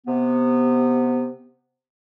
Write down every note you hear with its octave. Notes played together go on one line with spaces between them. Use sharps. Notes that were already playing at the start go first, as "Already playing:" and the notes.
C3 B3